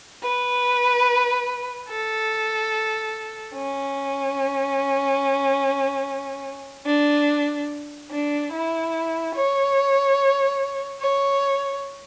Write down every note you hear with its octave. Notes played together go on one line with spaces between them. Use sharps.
B4
A4
C#4
D4
D4
E4
C#5
C#5